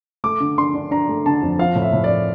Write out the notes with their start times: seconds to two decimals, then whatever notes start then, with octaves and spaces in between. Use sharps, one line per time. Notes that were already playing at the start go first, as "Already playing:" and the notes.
0.24 A3 D6
0.40 D3
0.58 D4 C6
0.74 D4
0.91 D4 A#5
1.09 A3
1.26 D3 A5
1.42 F2
1.59 F3 F5
1.75 A2
1.82 E5
1.93 A2
2.04 D5